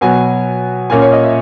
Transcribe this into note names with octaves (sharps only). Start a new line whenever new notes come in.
B2 F#3 B3 G#5
A#2 A#3 C#4 G#5
C#5
D#5
E5